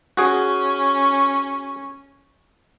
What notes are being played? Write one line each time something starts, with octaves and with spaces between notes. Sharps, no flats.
C#4 F#4 G#4